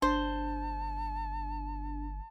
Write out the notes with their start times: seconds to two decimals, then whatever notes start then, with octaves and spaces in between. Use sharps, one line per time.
0.02 G1 D4 C5 A5